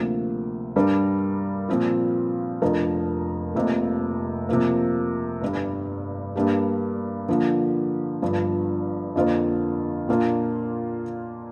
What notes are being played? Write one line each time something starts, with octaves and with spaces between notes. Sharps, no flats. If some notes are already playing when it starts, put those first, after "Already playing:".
Already playing: D2 C3 F3 A#3
G2 G3 D4 A#4
A#2 F3 C4 F4
F1 F2 F3 D4 A#4
F1 F2 C3 A#3
C3 F3 A#3
G1 G2 G3
G2 G3 A#3 D4 G4
D3 F3 A#3
G1 G2 F3 D4
F2 D3 A#3 F4 C5
A#2 A#3 D4 F4